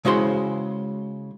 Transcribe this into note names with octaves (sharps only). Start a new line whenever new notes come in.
C#3 G#3 E4 F#4 C5 C6